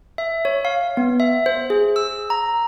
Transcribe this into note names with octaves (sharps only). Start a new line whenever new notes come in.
E5
C#5
F5
B3
E5
C5
G#4
E6
A#5